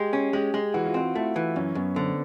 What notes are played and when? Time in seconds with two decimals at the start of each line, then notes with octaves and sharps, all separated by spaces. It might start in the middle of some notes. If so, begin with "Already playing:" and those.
Already playing: G#3 G4
0.13 C#4
0.33 G#3 G4
0.54 G#3
0.74 E3 F#4
0.86 F4
0.94 C4 F#4
1.15 A3 E4
1.36 E3
1.56 F#2 C#4
1.75 F#2 B3
1.96 D3 C4